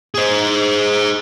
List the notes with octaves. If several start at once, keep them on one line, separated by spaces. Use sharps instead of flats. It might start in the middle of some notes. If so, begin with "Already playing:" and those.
G#4 C5